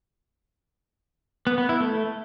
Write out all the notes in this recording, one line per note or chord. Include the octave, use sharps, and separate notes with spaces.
B3
B3
E4
A3